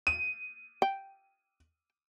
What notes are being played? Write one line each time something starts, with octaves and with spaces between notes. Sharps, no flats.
D#7
G5